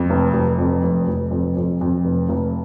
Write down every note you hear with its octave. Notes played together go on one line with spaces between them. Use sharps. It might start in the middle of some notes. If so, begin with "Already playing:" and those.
Already playing: F2
F1
F1
F2
F1
F1
F2
F2
F2
F1
F1